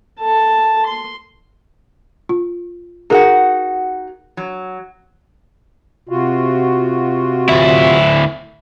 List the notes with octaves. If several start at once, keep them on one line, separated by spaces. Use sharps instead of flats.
A4 A5
C6
F4
D#4 F#4 G#4 A#4 F#5
F#3
C3 F4 F#4
D2 E4